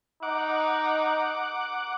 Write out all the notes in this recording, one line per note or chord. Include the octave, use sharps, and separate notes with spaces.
D#4 F#5 D6